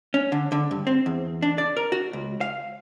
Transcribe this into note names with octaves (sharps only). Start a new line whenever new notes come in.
C#4
D3
D3
G2
C4
E2
D4
D5
A#4
F#4
C#2
F5